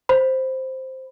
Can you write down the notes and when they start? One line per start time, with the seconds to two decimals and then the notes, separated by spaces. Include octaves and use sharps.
0.09 C5 B5